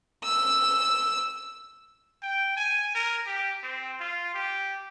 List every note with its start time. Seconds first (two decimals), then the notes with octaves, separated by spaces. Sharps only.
0.24 E6
2.23 G5
2.57 G#5
2.95 A#4
3.26 G4
3.63 C4
4.00 F4
4.34 G4